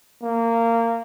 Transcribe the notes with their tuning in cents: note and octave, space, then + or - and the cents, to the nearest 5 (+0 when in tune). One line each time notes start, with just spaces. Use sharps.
A#3 -20